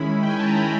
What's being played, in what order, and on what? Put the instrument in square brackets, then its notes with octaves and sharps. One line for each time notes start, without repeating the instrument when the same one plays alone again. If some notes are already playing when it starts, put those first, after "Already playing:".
Already playing: [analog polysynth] D#3 G#3 C#4 E4 B5
G5
G#5
A5
A#5
B5